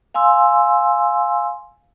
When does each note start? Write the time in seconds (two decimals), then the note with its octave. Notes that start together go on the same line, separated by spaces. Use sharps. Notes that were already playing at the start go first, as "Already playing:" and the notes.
0.14 F5 G#5 C6 E6